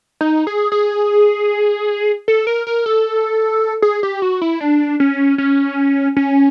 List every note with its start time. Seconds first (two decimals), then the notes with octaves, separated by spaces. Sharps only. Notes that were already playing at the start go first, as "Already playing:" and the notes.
0.21 D#4
0.47 G#4
0.72 G#4
2.28 A4
2.47 A#4
2.67 A#4
2.86 A4
3.82 G#4
4.03 G4
4.22 F#4
4.42 E4
4.61 D4
5.00 C#4
5.38 C#4
6.17 C#4